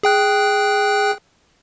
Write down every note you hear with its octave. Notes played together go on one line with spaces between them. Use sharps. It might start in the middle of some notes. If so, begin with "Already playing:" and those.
G#4 G5 F#6